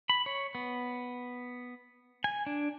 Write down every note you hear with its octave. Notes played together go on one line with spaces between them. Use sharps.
B5
C#5
B3
G#5
D4